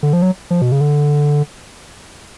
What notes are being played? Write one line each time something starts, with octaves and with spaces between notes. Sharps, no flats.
D3
F3
F#3
F3
B2
C#3
D3